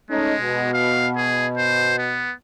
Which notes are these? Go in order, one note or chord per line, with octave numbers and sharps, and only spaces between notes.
G#3 A3 C#4 D#4
B2
F5
G#4
C5
B3